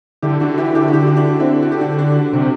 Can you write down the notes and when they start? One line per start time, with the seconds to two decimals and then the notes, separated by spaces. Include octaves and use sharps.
0.22 D3 E4 G4
0.40 D3 D4 F#4
0.58 E3 E4 G4
0.75 D3 E4 G4
0.88 F#4
0.93 D3 E4 G4
1.07 G4
1.16 D4 F#4
1.40 C4 E4
1.62 F#4
1.72 G4
1.81 D4 F#4
1.98 D4 F#4
2.33 C3 D4 F#4